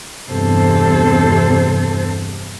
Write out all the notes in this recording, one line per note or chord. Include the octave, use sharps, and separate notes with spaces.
E2 G2 C3 A4 C5